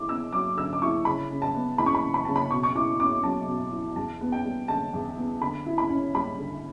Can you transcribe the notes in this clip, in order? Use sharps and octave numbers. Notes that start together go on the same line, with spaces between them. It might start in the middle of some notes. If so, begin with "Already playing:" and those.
Already playing: D3 E4 D6
B3 E6
F#3 D6
D3 E6
D6
E4 C#6
C#3 B5
C#3
A5
B3
E3 B5
C#6
B5
C#3
B5
C#3 A5
B5
B2 C#6
C#6
E4 D6
C#4 D6
F#3 A5
B2
E4
E2 A5
B3
G5
G3
D3 A5
E2
B3
D3 B5
E4
B5
C#4
G3 B5
D3